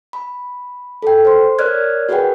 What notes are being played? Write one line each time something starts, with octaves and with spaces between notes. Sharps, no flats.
B5
A4 G5
C5 C6
A#4 C#5 D5 F6 F#6 G#6
F#4 G#4 A#4 B4 F#5 G5